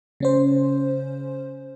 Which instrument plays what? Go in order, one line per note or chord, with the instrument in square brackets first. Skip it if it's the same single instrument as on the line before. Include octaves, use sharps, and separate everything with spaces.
[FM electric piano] C#3 C#4 C5